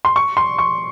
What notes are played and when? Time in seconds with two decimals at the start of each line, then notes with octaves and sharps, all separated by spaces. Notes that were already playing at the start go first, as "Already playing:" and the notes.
0.05 C6
0.16 C#6
0.37 C6
0.58 C#6